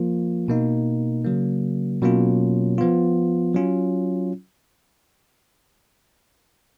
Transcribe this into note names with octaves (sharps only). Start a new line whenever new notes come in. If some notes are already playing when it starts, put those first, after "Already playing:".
Already playing: F3 A#3 F4
B2 A#3 D#4
C#3 F#3 A#3
B2 F#3 A#3 C#4 F4
F3 B3 F4
F#3 C#4 F4